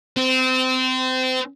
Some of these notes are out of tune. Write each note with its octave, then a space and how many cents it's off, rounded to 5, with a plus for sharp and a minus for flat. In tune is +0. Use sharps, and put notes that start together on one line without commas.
C4 -25